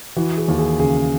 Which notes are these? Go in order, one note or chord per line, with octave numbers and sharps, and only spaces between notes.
E3 F#4
G#4
D#2
G#4
C#3 G#4